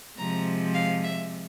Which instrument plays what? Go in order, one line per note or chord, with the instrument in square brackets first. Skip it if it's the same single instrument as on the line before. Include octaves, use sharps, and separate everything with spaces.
[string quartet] C3 F3 G#3 A#5
F5
E5